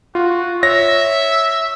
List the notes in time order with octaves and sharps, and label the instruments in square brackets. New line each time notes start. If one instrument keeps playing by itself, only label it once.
[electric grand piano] F4 [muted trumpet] F#4
[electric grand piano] C#5 A#6 [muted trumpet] E5